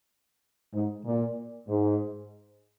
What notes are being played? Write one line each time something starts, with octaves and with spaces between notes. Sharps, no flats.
G#2
A#2
G#2